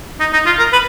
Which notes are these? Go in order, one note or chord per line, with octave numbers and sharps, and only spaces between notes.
D#4
D#4
F4
A#4
B4